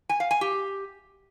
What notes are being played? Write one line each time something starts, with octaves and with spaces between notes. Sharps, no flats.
G#5
F5
G#5
G4